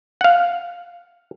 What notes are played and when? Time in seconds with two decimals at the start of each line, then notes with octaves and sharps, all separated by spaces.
0.21 F5 F#5